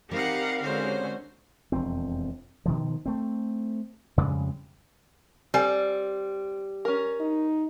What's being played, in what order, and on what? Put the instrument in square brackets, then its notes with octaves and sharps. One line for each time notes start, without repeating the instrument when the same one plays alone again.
[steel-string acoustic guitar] G3 C4 [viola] D#4 F#5 [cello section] G4 A#4 F5
[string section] D3 G#3 C#4 [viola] F#4 C5
[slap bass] E1 F2 C4
B2 D#3 F3
A3 C4
F2 C#3 G3 G#3
[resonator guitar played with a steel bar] G3 [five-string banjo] C4 A4 G#5
[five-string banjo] C#4 A#4
[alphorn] D#4